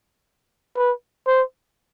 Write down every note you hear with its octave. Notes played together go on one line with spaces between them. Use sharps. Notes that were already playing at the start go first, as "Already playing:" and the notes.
B4
C5